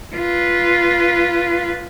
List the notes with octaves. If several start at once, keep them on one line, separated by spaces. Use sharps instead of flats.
F4 B4